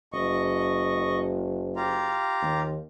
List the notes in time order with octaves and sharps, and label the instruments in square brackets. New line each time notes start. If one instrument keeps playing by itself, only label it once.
[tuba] F#1 [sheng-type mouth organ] D#5 C#6
[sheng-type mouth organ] F4 G4 A#5
[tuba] D#2